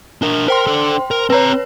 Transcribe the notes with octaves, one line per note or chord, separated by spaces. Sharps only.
D4 A#4
A#4 C5 G5 C6
D4 A4
A#4
C4 B4 C#5 A#5